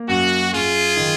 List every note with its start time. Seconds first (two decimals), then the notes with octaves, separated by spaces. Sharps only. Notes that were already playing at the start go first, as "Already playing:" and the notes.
Already playing: A#3
0.08 F#2 F#4
0.53 F#2 F4 G#4
0.97 D#3